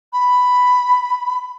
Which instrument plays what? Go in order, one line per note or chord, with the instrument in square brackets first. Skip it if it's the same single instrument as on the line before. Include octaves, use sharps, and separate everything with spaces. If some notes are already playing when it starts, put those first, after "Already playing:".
[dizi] B5